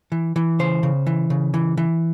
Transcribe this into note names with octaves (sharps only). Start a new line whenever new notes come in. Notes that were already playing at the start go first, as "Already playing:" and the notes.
E3
E3
C#3 C5
C#3
E3
C#3
E3
E3